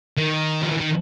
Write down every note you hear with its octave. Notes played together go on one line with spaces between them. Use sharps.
D#3
F3
E3
D#3